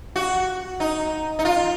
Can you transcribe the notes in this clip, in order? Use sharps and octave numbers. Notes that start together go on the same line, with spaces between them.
F#4
D#4
D#4
F4